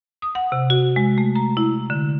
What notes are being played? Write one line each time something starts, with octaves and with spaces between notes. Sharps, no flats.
D#6
F#5
C3
F#4
G#3
A3
A#5
E4
D3